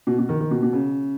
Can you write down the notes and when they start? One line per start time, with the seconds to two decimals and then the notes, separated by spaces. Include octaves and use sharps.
0.07 B2
0.18 B2
0.29 D#3
0.41 D#3
0.51 B2
0.63 B2
0.73 C#3